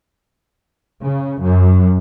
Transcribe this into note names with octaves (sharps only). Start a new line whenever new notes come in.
C#3
F#2